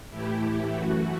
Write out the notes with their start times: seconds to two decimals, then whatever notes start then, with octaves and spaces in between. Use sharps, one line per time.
0.10 A2 E3 A3 E4 G4
0.41 E4
0.72 F#2 E3 A3 F#4